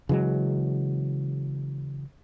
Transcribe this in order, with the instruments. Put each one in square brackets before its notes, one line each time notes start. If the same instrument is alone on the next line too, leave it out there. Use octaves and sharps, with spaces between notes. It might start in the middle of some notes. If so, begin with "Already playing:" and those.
[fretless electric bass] C#3 E3 F#3 G#3